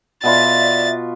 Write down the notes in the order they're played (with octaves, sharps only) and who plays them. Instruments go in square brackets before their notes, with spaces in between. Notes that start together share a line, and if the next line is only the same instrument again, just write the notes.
[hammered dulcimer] B2 B3 F4 [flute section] D5 E5 [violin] A6